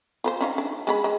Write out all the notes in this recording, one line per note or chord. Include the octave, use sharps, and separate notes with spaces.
F4 B4 C5
C#4 D#4 F5
D4
G#3 G#4 B5
G#3